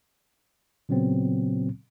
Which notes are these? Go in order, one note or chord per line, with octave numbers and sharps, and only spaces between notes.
A#2 C#3 F#3 B3 C4